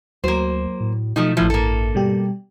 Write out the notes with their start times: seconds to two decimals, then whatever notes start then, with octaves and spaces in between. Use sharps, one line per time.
0.24 D2 F#3 A#3 C5
0.80 A2
1.16 B2 F3 A3 D#4
1.37 A1 A2 F3 E4
1.50 G2 A#3 A4
1.95 B2 G3 G4